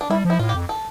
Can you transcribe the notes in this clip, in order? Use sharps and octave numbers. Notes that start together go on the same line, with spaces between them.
D4
G3 E4
F3
E4
A2 F4
G4
F2
A4